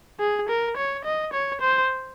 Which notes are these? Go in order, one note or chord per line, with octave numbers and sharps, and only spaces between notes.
G#4
A#4
C#5
D#5
C#5
C5